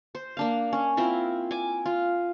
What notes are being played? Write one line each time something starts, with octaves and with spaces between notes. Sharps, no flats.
C5
A#3 D4 F5
C#4
C4 E4 F4 A#4
G#5 D6
F4